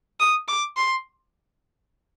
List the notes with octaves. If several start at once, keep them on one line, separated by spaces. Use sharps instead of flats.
D#6
D6
C6